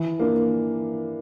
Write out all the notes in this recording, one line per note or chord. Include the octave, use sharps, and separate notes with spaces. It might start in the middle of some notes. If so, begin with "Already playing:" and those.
Already playing: E3
A#3 D4